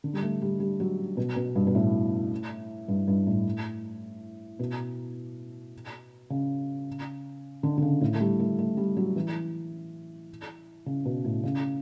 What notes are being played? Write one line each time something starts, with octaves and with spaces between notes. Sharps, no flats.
D3
G3
A3
G3
G3
F#3
B2
B2
G2
B2
A2
G2
G2
A2
B2
C#3
D3
D3
C#3
A2
A3
G3
A3
A3
G3
F#3
E3
C#3
B2
A2
C#3